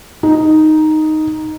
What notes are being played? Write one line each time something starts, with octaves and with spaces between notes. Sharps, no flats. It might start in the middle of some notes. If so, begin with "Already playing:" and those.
D#4